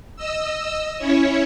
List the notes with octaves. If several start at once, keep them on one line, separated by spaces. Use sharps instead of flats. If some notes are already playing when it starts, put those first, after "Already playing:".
D#5 E6
C#4 E4 C#5